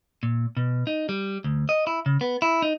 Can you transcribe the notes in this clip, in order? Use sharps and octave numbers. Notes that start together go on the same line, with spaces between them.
A#2
B2
D#4
G3
D2
D#5
E4
C#3
B3
E4
D#4